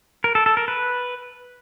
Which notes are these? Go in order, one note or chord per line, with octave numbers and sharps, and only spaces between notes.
A#4
A4
A4
A#4
B4